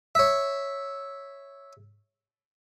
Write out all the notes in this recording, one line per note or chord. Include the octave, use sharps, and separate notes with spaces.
C#5 E5